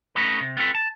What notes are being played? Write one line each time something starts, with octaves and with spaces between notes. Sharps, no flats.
A3 C#4 D#4 F#4 B4
C3
B3 C4 F4 A4 B4
A5